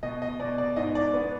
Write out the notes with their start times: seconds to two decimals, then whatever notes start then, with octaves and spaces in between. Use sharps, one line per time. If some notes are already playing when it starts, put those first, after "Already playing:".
0.03 B2 D#5
0.22 D#5
0.40 B2 D5
0.58 D5
0.76 G#2 D#5
0.95 D5
1.13 B3